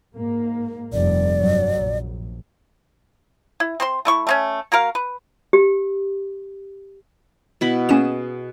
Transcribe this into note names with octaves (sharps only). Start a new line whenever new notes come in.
G#2 A#3
F1 G2 D5
G2 F#3
A#1
E4
C4 C5 C6
A3 E4 C#6
A3 C4 C#4
A#3 F#4 A#4 F5
B4
G4
B2 E4 B5
A#3 C#4 G#4 D#5 E7